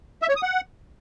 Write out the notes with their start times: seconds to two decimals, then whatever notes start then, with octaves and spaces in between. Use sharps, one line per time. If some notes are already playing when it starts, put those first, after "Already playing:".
0.22 E5
0.29 C#5
0.36 D#6
0.43 F#5